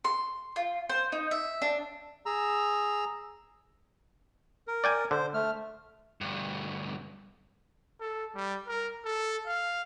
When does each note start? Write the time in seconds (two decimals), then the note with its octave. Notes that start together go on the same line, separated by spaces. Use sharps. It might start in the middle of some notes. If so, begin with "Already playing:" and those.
0.05 C6
0.56 F4
0.90 C5
1.12 D#4
1.31 E5
1.62 D4
2.26 G#4 A#5 E6
4.68 A#4
4.84 D5 G5 G#5
5.11 D3 C5
5.34 A3 F6
6.21 D2 G2
8.00 A4
8.35 G3
8.68 A#4
9.04 A4
9.46 F5